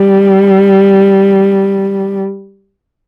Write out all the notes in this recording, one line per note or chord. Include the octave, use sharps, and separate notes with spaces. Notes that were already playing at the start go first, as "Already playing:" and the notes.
Already playing: G3